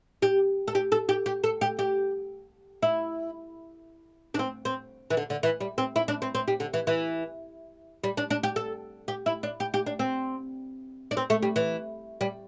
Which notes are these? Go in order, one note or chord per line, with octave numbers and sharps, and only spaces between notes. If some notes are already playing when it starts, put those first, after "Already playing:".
G4
A4
G4
A4
G4
G4
A4
G4
G4
E4
D4
C4
C4
E3
D3
D3
E3
G3
C4
E4
D4
C4
C4
G3
D3
E3
E3
G3
D4
D4
G4
A4
G4
E4
D4
G4
G4
D4
C4
D4
C4
A3
G3
E3
G3